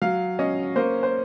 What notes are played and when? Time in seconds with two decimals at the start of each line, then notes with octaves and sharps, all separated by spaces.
0.02 F#3 F5
0.39 C#4 D#5
0.76 A#3 C5
1.03 C5